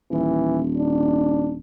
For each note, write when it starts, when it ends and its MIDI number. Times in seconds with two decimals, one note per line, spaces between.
0.11 1.60 27
0.11 0.61 52
0.77 1.53 62